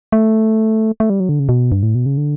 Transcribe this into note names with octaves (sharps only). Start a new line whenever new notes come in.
A3
A3
G3
F#3
D3
C#3
B2
G2
A2
B2
C#3
D3